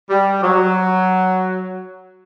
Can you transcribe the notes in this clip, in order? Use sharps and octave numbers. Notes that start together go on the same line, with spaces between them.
G3
F#3